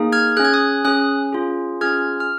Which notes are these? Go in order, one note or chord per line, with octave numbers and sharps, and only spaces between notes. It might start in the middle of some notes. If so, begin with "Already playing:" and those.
Already playing: A#3 D#4 G#4
F6 G#6
C#4 G#4 F#6
G#6
D#6 F#6
C#4 G#4 D#6 F#6
C#4 F4 G#4
C#4 F4 G#4 F6 G#6
F6